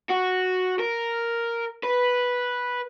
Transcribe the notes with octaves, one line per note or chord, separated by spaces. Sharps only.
F#4
A#4
B4